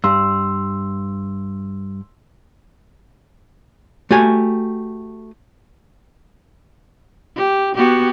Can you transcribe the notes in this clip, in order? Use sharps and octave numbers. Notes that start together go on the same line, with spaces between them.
G2 C6 E6
A3 F#4 G4 G#5
G4
B3 F#4 G4